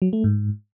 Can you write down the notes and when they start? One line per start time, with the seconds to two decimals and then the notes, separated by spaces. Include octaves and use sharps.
0.02 F#3
0.13 A3
0.24 G#2